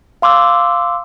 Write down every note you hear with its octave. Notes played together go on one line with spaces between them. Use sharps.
F5 C6 D6 E6